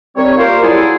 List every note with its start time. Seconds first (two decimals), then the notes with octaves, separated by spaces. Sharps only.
0.16 D#3 G3 C4 C#5
0.38 A#3 F4 G4 A#4 C5
0.63 F#3 G3 E4 F4 G#4 A4